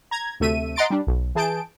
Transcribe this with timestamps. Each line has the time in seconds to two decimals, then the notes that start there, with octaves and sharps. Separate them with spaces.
0.11 A#5 G#6
0.40 D2 C3 A3 E5 D#7
0.76 D#5 F#5 A#5 C6 A6 D7
0.90 G3 D4
1.07 B1
1.35 E3 G#4 A5 G6 D7